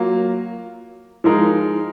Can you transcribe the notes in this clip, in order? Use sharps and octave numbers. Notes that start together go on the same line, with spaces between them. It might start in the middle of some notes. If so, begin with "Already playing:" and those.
Already playing: F#3 A#3 F4
F3 G#3 D#4 A#4